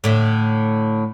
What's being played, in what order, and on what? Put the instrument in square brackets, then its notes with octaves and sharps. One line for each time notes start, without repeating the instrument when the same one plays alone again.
[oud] A2 D3 E5